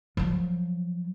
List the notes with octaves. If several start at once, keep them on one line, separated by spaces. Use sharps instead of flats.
F3 F#3